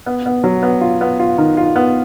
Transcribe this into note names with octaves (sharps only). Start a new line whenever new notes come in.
B3
B3
F#3
B3
F4
B3
F4
D#3
F4
B3